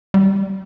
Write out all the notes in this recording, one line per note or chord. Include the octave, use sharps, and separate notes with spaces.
G3